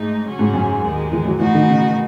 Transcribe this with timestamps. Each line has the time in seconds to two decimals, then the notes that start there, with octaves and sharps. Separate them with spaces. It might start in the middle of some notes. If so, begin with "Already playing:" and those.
Already playing: G#2 A3 D#4
0.25 C#3 F#3 C#4 F#4
0.39 G#2
0.54 F#2
0.83 D#2 D#3 G#3
1.12 E3
1.25 F#3
1.39 B2 E3 A3 D#4 F#4
1.55 D#3
1.68 C#3